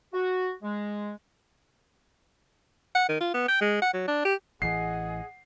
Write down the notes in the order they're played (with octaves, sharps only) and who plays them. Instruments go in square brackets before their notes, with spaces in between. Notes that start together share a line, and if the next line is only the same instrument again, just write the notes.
[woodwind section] F#4
G#3
[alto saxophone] F#5
D#3
F4
B3
G5
G#3
F#5
F#3
D4
G4
[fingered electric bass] A1 E3 [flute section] G#4 D#5 [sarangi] F#5 [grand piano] C7